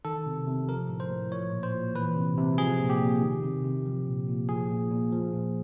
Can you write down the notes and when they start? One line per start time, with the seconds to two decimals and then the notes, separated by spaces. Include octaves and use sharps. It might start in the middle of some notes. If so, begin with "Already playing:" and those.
0.05 D#3 A4
0.26 C3
0.47 C3
0.68 F3 A#4
0.89 A2
1.00 C5
1.10 A2
1.32 F3 C#5
1.53 A#2
1.63 C5
1.74 A#2
1.95 E3 B4
2.16 C3
2.37 C3
2.58 F3 G#4
2.79 A#2
2.90 G4
3.01 A#2
3.22 D#3
3.43 C3
3.64 C3
3.85 F3
4.07 A#2
4.28 A#2
4.49 F3 G#4
4.70 A#2
4.91 A#2
5.12 F3
5.33 A#2